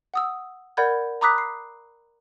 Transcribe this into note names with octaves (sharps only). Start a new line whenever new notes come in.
F#5 D#6 E6
A#4 D5 F#5 B5 G6 G#6
A#5 B5 D6 D#6 F#6 B6
C7